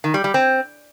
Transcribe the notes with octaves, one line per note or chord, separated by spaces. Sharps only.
D#3
G3
G3
C4